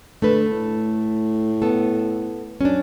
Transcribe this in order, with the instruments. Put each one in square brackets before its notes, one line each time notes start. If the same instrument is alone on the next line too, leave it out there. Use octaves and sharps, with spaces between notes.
[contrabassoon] D3 [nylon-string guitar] A3 A4 B4
[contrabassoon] A2
[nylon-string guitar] B3 A4
[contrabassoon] F#2 [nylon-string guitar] C#4 D4